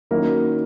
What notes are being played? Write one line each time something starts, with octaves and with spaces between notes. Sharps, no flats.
D#3 F#3 A#3 C#4 E4 A#4